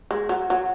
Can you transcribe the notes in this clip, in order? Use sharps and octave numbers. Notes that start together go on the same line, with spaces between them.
G#3
F#3
F#3